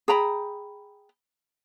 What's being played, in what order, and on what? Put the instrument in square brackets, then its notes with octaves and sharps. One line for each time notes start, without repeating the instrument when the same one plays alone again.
[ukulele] G#4 G5 A#5 B5